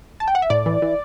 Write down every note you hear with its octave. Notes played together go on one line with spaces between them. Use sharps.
A5
G5
F#5
E5
A2 D5
E3
E3